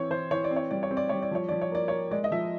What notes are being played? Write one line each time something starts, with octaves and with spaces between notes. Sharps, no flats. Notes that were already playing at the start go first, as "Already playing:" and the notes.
Already playing: E3 C4 C#5
E3 C5
E3 C#5
D5
C4
C#5
G3 D5
C#5
C4
D5
G3 C#5
D5
F3 C#5
F3 D5
C#5
A#3 D5
C#5
A#3
G#3 D5
D#5
F3 E5